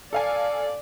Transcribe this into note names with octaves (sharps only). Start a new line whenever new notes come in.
A4 D5 F5 G#5